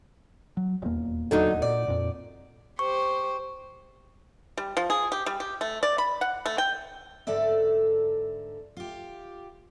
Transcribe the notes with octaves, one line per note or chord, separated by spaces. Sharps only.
F#3
D#1 E2 A#3
D3 F#3 D#4
A#2 D5
F2 A#2
G4 C5 C#6
G3
F3
G#4
G4
G3
G4
A3
D5
B5
F#5
A3
G5
G#2 D3 A4 D5 E5
F4 G4